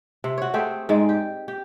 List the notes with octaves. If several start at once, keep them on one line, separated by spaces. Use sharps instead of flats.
C3
F#4 C#5
A3 C4 G4 G#4
G#2 G#3 D5
G4
G4